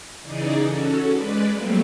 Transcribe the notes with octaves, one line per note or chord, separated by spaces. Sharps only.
C#3 E3 D#4 G#4 D5
C#4 F#4 A4
G#3 B4 D5
F#3 G3 A3 A#3 C4